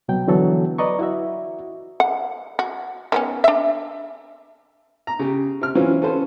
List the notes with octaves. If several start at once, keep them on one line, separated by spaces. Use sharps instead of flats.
C2 B2 F#3 G5
D3 E3 F#3 B3 A4
B4 D5 D#5 A#5 C#6
E4 F#4 E5
F#5
F#4
D#3 B3 C#4
D4 E5
A#5
C#3 G4
C3 F6
E3 F#3 C4 C#4 F4
C#4 A4 B4 C5